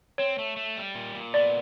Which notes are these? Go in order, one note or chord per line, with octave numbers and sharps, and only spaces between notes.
C4 C#5
A3
A3
G3
A#2
A#2
B3 D5